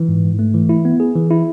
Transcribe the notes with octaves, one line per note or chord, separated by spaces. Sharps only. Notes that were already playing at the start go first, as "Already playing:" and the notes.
Already playing: E3
G#2
G#2
A3
E3
E4
B3
G#4
E3
E4